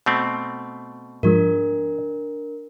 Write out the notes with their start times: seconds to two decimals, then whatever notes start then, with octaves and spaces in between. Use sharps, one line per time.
0.06 B2 A3 C4
1.23 G#2 F3 G#3 D4 A#4